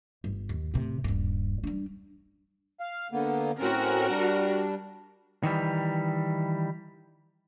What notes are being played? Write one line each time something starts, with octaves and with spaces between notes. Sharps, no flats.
G1
D#2
A2 C3
D#1 G2
G3 D4
F5
D3 A#3 B3
A2 C4 C#4 F#4 A#4
G3 D4
D#3 E3 G3